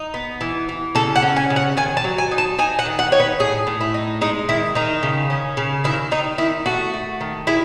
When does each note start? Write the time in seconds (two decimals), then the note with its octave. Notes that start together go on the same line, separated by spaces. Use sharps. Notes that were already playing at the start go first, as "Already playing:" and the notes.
Already playing: D#4
0.14 B3
0.41 E3
0.69 E3
0.95 C#3 A4
1.16 F#5
1.22 C#4
1.36 G#5
1.50 C#3
1.56 F#5
1.77 D#3 G#5
1.97 A5
2.04 F#3
2.18 G#5
2.31 D#4
2.38 A5
2.58 D#4 G#5
2.79 F#5
2.86 D#3
2.99 F#5
3.12 D#4 C#5
3.20 B4
3.40 A2 G#4
3.67 A2
3.81 E4
3.94 D#4
4.21 G#3 D#4
4.49 D#3 E4
4.75 D#3 D#4
5.03 C#3
5.30 C#4
5.57 C#3
5.84 D#3 E4
6.11 D#3 D#4
6.38 D#3 E4
6.66 A3 F#4
6.94 A3
7.21 D#3
7.47 G#3 E4